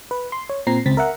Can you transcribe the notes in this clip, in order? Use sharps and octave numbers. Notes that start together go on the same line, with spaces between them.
B4
C6
C#5
A#2 C4 A#5 C7
C#2 C4 A6 B6
A#4 E5 F#5